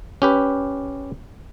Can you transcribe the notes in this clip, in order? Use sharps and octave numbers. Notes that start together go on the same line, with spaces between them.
C#4 G4 B4